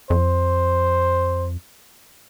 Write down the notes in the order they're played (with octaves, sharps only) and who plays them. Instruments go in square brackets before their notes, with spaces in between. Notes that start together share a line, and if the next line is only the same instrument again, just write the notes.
[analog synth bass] F2 [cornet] C5